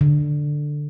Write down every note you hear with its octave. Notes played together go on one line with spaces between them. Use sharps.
D3